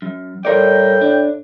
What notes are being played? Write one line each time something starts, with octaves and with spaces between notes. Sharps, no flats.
F#2
A2 G3 A#4 D5 G5
D4